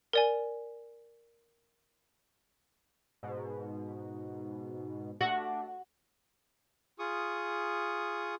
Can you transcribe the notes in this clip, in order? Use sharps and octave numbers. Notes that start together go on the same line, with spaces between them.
A#4 D5 G#5
G#2 B2
A3 D4 F#4
F4 G#4 C#6 D#6